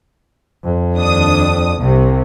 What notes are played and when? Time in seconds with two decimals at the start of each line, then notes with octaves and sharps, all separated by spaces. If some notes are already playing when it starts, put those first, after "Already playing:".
0.64 F2
0.95 D#2 D4 D#6
1.82 C2 C3